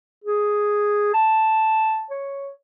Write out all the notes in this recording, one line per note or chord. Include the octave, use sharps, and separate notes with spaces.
G#4
A5
C#5